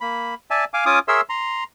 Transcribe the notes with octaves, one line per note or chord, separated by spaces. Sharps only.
A#3 B5
D5 E5 G#5 A5
F5 G#5 D6
C#4 F4 G#5 D6 D#6
G#4 A#4 C#5 E5 C6 E6
A#5 C6